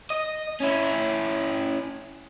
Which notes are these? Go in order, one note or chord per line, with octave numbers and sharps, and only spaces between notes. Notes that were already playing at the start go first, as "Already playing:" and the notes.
D#5
C#4 E4